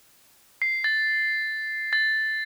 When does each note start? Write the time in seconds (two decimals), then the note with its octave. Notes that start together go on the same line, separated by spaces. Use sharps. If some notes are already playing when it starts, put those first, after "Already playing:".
0.62 C7
0.84 A6
1.93 A6